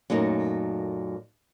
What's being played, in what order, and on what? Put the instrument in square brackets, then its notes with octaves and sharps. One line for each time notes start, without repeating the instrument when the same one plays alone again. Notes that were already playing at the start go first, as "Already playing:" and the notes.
[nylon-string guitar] F#2 A#2 A3 D#4